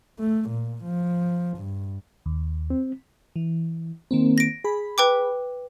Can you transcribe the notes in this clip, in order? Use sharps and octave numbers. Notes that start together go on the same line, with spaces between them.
A3
A#2
F3
G2
D#2
C4
E3
D#3 A#3 C4
A#6 D7
G#4 B5
B4 G5 D6